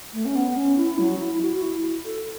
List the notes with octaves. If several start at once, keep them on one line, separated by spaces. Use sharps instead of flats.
A3
C#4
B3
C#4
E4
F#3
E4
F#4
E4
A4